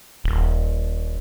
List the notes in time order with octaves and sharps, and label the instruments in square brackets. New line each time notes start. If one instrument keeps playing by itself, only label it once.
[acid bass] D#1